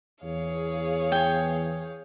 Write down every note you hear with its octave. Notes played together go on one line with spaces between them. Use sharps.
E2 G#4 C#5 F5
G5 G#5